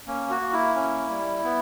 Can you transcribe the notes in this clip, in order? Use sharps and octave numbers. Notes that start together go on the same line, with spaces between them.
A#3 C#4
F#4
A#3
E4
C#4
G3
B3